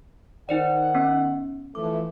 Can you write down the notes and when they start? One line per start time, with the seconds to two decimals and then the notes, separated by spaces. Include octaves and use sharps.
0.49 D#3 D#4 C5 D5 F#5
0.94 B3 C#4
1.75 E3 F3 A3 D6